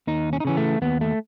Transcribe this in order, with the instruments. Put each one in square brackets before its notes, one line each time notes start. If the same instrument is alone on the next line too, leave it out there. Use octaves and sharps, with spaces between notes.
[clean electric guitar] D#2 D#4
C#4
D#4
C#3 E3 C#4
A3
D#2 B3
A3